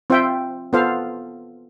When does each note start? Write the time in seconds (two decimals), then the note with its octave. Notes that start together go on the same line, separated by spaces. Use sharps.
0.10 C4 F4 C5 E5 G5
0.73 B3 F4 A4 C5 F5